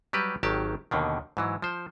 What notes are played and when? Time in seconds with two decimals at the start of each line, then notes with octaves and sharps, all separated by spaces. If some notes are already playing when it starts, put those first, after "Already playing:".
0.13 F#3 G3 G4 B4
0.43 G#1 D#3 F#3 G4 A5
0.91 D#2 B2 D3 D#3
1.37 G#2 E3 F#3
1.62 F3 C5